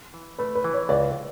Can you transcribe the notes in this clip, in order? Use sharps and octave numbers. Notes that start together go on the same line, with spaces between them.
E3
A3 B4
B4
E3
C#5
C#2 D5